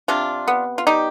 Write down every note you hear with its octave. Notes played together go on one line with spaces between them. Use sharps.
C3 D4 F4
B3
F4
G3 D#4 G4